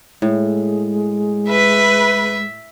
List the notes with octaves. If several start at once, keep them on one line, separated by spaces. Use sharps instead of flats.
A2 G#3
B4 E5